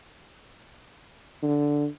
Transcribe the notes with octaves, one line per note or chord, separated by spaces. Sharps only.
D3